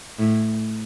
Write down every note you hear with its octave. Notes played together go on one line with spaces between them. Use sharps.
A2